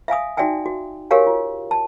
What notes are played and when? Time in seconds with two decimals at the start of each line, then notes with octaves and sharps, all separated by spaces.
0.08 E5 F5 G#5 D#6
0.37 D#4 F#4 D5 E5 G5 G#5
0.66 F#4
1.11 F#4 G4 A#4 C#5 F5 G#5
1.27 F4
1.71 A5